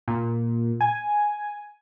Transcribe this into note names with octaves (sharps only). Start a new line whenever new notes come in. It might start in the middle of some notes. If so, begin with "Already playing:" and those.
A#2
G#5